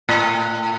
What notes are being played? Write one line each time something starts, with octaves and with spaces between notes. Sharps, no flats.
A2